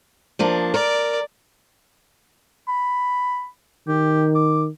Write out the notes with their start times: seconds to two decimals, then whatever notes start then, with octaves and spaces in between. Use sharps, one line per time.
0.39 F3 A#3 D4
0.74 A#4 D5
2.68 B5
3.88 D#3 G4
4.35 D6